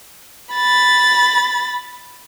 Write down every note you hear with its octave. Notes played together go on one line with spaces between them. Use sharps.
B5 A6